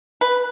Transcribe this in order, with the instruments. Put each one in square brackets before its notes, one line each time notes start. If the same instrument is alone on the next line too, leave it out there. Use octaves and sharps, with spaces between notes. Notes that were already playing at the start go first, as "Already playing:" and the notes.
[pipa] B4